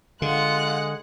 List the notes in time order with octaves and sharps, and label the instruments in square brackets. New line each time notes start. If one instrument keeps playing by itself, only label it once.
[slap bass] D3 [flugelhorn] G#3 [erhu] F4 [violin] F#5 F#6